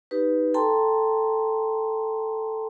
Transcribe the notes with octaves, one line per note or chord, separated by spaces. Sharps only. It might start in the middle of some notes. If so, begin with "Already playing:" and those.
D#4 G4 B4
A4 G5 A5 A#5 C6